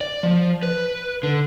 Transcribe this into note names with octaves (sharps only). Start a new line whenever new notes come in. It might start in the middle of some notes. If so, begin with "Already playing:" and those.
D5
F3
B4
D3